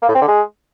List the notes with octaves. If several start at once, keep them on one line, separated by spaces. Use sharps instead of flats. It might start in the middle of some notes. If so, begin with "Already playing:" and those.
A#3
A2
C4
D3
G#3